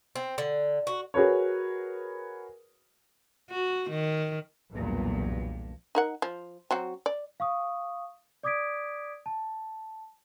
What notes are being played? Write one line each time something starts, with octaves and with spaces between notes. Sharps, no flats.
C4
D3
F#4
F#4 G#4 A#4 B4 C#5
F#4
D#3
B1 E2 G2 A#2
D#4 A#4 F#5
F3
F#3 C4 F#4
D5
F5 C#6 D#6
D5 D6 D#6 G#6 B6 D7
A5